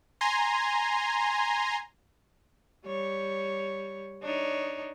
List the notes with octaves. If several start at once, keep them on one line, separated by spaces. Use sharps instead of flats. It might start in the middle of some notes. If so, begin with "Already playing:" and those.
G#5 A#5 C6
G3 C#5
D4 D#4 C#5